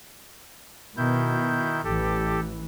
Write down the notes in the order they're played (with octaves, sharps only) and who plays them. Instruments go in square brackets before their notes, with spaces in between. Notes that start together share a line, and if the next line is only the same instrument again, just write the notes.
[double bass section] B2 [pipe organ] D#3 E4 G6
[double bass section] A1 E3 [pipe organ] G4 A4